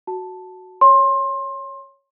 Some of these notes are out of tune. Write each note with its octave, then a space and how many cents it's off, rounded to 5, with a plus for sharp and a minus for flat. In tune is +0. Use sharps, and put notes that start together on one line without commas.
F#4 +0 A5 +0
C#5 +0 C6 +25